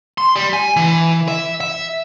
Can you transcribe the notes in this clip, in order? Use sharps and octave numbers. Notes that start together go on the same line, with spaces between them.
C6
G3
G#5
E3
E5
E5